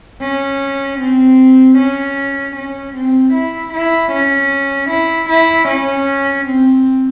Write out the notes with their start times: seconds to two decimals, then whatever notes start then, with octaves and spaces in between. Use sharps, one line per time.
0.22 C#4
1.00 C4
1.78 C#4
2.56 C#4
2.95 C4
3.34 E4
3.73 E4
4.12 C#4
4.90 E4
5.29 E4
5.68 C#4
6.47 C4